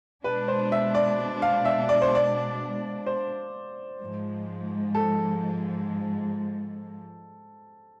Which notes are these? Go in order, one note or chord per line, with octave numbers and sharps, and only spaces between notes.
B2 G#3 D4 B4
C5
E5
D5
F5
E5
D5
C5
D5
C5
G#2 F3 G#3
A4